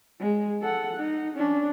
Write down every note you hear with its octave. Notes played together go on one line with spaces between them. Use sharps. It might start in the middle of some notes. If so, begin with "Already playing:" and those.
G#3
A4 F#5
D#4
C#4 D4